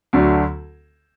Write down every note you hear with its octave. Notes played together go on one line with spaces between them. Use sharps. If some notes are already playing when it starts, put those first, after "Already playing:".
D2 D3 F#3 A3 D4